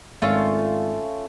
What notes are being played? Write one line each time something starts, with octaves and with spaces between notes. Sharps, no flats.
G#1 A3 C#4 F4